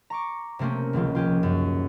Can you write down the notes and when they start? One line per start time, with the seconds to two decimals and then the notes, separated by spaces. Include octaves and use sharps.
0.10 A#5 C#6 D6
0.59 C3 A3 A#3 C4 C#4
0.93 D#1 C#2 F3 F4
1.15 F4 G4 G#4
1.43 F#2